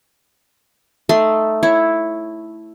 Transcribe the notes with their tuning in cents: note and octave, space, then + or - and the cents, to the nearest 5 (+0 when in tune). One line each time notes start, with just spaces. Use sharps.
A3 +0 D#4 +0 C6 -20
E4 +0 C#5 +0